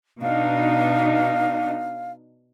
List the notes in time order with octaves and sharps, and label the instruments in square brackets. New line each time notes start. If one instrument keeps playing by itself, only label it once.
[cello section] B2 D4 D#4 [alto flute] F5